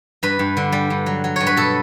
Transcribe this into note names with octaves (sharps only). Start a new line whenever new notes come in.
G2 B4
G2
D3
G3
G2
F#3
F#3
G2 C#5
B4
B2 A4